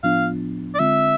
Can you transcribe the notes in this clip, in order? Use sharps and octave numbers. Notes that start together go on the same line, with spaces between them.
A2 F3 B3 D4 F4 F5
D5
D3 G#3 C4 F4 E5